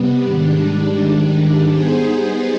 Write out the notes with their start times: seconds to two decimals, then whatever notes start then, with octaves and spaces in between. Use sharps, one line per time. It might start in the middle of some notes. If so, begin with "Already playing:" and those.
Already playing: C3 G3 B3
0.25 G#2 D#3 G3 D4
1.68 G3 B3 D#4 G#4 C5